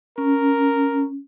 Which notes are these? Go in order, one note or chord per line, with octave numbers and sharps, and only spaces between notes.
C#4 A#4